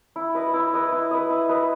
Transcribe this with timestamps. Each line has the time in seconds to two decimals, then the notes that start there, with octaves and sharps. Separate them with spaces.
0.16 E4
0.35 B4 D#5
0.54 E4
0.74 B4 D#5
0.92 E4
1.11 B4 D#5
1.30 E4
1.49 B4 D#5